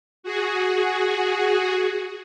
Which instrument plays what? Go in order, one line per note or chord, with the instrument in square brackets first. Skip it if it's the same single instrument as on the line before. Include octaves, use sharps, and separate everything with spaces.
[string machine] F#4 G#4